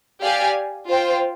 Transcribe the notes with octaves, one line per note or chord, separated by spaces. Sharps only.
G4 D5 F5 G#5
F4 C5 G5